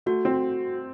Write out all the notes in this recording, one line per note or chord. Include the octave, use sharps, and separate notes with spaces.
A3 F#4
C4